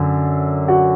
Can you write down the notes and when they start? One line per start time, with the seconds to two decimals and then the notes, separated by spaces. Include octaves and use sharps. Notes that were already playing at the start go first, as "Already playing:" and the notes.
Already playing: F#2 D3
0.68 F#4